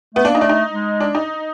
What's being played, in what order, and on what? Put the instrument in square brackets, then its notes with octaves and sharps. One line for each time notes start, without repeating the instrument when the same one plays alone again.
[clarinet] A3 [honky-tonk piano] B3
[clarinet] A#3 [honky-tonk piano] D4
[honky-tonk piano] D#4
[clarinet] A3 [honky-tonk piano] D4
[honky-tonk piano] D#4
[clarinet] G#3
[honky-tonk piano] D4
D#4